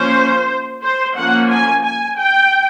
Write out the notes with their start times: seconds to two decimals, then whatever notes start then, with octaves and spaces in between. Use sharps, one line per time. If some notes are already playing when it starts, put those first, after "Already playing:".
Already playing: F3 A#3 C#4 C5
0.82 C5
1.16 F3 A#3 C#4 F#5
1.50 G#5
1.84 G#5
2.18 G5